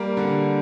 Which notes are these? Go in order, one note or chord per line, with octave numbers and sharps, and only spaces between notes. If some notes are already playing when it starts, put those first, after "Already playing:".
Already playing: G3 A#3
D3